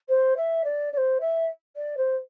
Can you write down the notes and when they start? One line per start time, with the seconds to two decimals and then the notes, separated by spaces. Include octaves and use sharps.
0.08 C5
0.36 E5
0.64 D5
0.92 D5
0.97 C5
1.20 E5
1.76 D5
1.97 C5